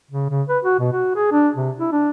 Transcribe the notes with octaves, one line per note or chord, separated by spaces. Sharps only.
C#3
C#3
B4
F#4
B2
F#4
G#4
D4
C3
E4
D4